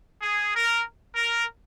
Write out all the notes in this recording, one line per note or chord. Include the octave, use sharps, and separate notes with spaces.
G#4
A#4
A#4